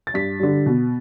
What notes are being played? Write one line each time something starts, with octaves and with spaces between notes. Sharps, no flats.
A6
G2 B6
D3 G3
B2